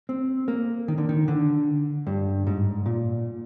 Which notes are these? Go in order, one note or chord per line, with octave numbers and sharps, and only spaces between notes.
C4
A#3
D#3
D3
D#3
D3
G2
G#2
A#2